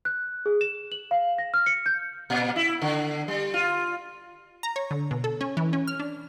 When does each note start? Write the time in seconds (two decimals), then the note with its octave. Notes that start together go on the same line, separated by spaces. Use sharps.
0.05 F#6
0.46 G#4
0.61 E7
0.92 F#7
1.11 F5
1.38 A#6
1.54 F6
1.66 C#7
1.86 G6
2.30 A#2
2.56 E4
2.82 D3
3.28 G3
3.54 F4
4.63 A#5
4.76 C#5
4.91 D3
5.11 B2
5.24 A4
5.41 C#4
5.57 E3
5.73 C#4
5.87 F6
6.00 D4